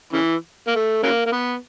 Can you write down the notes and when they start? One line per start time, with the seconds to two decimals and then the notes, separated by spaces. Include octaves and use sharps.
0.13 C#3 E3
0.67 A#3
0.76 A3
1.03 C#3 F#3 A#3
1.26 A#3
1.32 B3